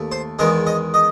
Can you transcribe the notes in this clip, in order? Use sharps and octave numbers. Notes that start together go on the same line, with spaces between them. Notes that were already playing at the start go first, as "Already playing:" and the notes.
Already playing: D#2 A3
C5
E2 D#3 G#3 D#5
D#5
D#5